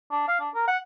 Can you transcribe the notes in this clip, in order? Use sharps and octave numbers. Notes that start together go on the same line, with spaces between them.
D4
F5
D4
A#4
F#5